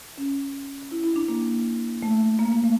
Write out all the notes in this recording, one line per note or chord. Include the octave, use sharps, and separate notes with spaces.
C#4
E4
E4
D4
A#3
A3
A#3
A#3
A3